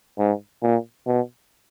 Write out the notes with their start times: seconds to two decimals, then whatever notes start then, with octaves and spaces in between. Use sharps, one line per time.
0.19 G#2
0.63 A#2
1.07 B2